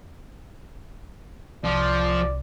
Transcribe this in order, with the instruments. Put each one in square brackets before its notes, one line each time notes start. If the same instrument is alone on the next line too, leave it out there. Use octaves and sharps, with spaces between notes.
[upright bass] C2 [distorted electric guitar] F3 [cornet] D5